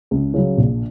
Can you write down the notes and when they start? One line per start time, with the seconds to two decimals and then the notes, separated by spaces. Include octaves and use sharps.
0.11 C#2
0.34 C#3 F#3
0.58 A#1